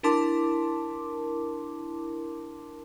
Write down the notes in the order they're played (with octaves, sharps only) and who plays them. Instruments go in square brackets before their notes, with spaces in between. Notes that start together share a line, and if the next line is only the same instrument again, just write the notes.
[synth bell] D4 E4 A#4 A5 C6 D6